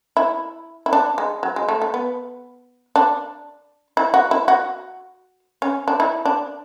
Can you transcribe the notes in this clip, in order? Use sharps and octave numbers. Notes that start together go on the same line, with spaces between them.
E4
E4
D4
G#3
F#3
G#3
A3
A3
B3
D4
E4
F#4
E4
F#4
C#4
D4
E4
D4